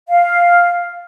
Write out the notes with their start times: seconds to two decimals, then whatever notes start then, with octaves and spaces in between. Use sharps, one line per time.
0.08 F5